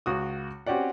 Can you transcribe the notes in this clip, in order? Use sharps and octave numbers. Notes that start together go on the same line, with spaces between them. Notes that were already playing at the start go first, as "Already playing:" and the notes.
C#2 F#4 D#6
C4 C#4 F#4 G4 D5 F#5